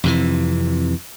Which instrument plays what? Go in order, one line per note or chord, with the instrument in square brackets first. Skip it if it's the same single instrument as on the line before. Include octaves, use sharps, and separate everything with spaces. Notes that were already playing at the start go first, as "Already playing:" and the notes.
[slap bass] F2 C3 E3